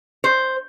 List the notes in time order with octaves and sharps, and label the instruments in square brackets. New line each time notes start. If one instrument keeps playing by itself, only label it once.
[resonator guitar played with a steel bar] C5